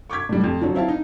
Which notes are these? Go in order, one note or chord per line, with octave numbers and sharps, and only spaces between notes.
C#6 D6 G6 G#6 B6
A2 G3
F2
D3 F3 F#3 C#4
C4 E4 F5 A5
D#4